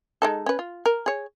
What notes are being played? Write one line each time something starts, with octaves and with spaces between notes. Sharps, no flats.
G#3 D#4 A4
C#4 B4
F4
A#4
G#4 C#5